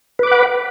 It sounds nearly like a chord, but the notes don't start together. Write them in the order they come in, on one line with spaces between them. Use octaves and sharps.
B4 D6 B5 F#5